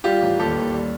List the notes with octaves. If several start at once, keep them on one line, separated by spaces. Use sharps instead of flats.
G3 F4 G4
A1
D#2 G4 A4
D#2
G3